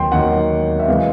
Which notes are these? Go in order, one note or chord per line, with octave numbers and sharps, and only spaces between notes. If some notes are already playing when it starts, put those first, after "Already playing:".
Already playing: D#2 D#3 F#3 G5 C6
D#2 D#3 F#3 F#5
E5
C3 E3 G#3 F5